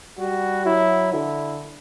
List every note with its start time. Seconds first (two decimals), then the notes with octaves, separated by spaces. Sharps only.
0.19 G3 F#4
0.65 F#3 E4
1.13 D3 E4